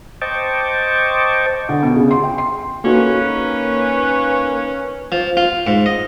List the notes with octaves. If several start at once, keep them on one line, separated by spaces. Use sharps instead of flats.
C5 D#5 G5 A5 C#6 D6
D3
B2
C#3
C6
G5
C6
D#3 A#3 C#4 D#4 F#4 A4 B4
F3
F4
G#2
D#5